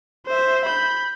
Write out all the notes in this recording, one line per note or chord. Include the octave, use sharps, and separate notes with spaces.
C5 E5
B5 G6